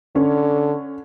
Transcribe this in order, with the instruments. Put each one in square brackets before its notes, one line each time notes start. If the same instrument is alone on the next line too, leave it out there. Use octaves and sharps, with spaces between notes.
[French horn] D3 [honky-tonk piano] C#4